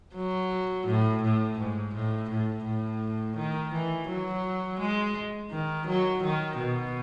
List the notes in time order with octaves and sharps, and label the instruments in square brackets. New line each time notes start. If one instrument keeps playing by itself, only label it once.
[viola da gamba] F#3
A2
A2
G#2
A2
A2
A2
D#3
E3
F#3
G#3
D#3
F#3
D#3
B2